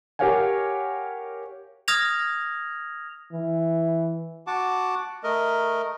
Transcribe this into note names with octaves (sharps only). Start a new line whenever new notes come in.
G4 A#4 C#5 F5 F#5 G#5
D#6 F6 G#6 A#6 F7
E3
F#4 F#5 A5 D6
A3 A#4 D#5